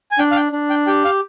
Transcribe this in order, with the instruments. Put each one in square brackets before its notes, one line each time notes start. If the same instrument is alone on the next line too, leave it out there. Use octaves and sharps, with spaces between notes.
[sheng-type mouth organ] G#5
D4 G5
F5
G5
D4
G5
G4 G5
F5